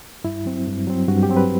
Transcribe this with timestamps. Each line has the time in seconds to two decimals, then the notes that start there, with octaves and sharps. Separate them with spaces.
0.24 G2 E4
0.45 F#3 C4
0.67 G2
0.87 F#3 C4
1.08 G2 F#4
1.23 G4
1.29 F#3 C4
1.37 B4